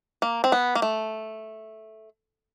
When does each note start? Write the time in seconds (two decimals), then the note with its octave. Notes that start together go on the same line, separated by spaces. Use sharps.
0.22 A#3
0.44 C4
0.52 B3
0.75 A#3
0.82 A3